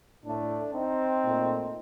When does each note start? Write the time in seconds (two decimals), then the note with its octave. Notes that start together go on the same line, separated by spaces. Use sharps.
0.25 A2 A3 D4
0.74 C4 D#4
1.24 A#2 A3